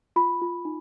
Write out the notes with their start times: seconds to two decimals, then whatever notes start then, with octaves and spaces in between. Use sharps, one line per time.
0.16 F4 B5
0.42 F4
0.65 D#4